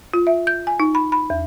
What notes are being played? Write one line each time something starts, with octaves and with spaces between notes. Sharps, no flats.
F4
E5
G6
G#5
D#4
B5
B5
E2